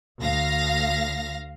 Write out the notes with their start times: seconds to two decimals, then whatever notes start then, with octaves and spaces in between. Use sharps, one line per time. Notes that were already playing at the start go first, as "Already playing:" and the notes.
0.22 D2 F5 A#6